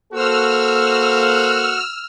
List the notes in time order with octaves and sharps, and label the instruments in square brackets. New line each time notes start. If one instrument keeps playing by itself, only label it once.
[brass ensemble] A#3 A4 [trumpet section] F#4 [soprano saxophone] C5 [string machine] E6 F6